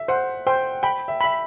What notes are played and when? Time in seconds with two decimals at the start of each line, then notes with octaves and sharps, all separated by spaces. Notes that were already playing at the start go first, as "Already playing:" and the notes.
Already playing: E5
0.08 C5 F#5
0.47 C5 G5
0.83 G5 B5
1.08 E5
1.21 E5 B5